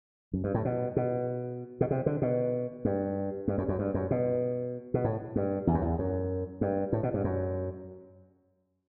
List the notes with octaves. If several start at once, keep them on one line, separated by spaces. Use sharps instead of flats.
F#2
G2
A2
B2
B2
B2
C3
D3
B2
G2
G2
F#2
F#2
G2
F#2
B2
B2
A2
G2
E2
F#2
E2
F#2
G2
A2
B2
G2
F#2